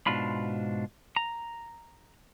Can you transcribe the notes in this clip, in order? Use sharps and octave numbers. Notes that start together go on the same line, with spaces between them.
G#2 B2 D4 F4 B5
A#5